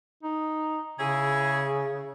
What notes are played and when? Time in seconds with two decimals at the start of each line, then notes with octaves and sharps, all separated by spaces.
0.23 D#4
1.00 C#3 C#4 E4 G#4